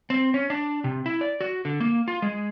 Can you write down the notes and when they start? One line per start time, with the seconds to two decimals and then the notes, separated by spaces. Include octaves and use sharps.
0.10 C4
0.34 C#4
0.50 D4
0.84 C3
1.06 E4
1.21 D5
1.40 F#4
1.65 D3
1.80 A#3
2.08 F4
2.22 G#3